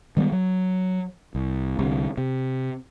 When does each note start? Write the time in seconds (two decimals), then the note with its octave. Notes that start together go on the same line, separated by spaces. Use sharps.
0.17 D#3 G3 G#3 B3
0.32 F#3
1.35 C2
1.79 C2 D3
2.18 C3